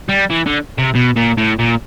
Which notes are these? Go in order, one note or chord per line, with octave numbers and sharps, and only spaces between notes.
G3
E3
D3
C3
B2
A#2
A2
A#2